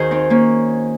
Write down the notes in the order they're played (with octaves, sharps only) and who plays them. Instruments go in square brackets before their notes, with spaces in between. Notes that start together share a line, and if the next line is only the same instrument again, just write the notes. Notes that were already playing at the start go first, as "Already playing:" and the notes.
Already playing: [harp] D#2 D#3 F#4 G#4 A#4 C5
C4 D#4
A#3 C#4